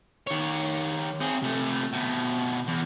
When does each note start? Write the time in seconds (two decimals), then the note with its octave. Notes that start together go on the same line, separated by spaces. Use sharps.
0.27 D#3 C#5
1.21 C4 G#4
1.43 C3 A3
1.93 B2 A3
2.67 E2